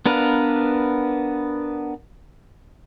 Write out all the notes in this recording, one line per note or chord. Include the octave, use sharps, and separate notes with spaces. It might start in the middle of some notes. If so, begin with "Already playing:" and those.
B3 D4 A#4 B4 F5